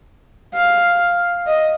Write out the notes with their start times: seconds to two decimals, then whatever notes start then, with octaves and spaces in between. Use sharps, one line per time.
0.54 F5
1.46 D#5